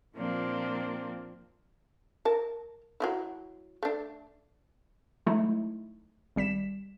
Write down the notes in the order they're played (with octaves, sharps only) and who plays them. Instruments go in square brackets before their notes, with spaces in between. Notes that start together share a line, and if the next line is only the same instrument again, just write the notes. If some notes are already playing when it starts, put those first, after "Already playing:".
[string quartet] A#2 F3 A#3 C4 D4
[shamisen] A#4 A5
F#3 D#4 E4
A3 D4
[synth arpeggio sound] E3 F#3 G#3 A3 D#4 E4
G#1 G3 B6 E7